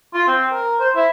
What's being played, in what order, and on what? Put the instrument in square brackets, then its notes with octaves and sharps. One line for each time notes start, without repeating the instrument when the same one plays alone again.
[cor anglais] F4
C4
A#4
C5
E4